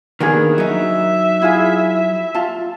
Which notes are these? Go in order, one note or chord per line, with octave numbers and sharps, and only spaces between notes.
D#3 A#3 B3 D4 G#4 A#4
F#3 D#4 E5
E4 F4 G#4
F4 A5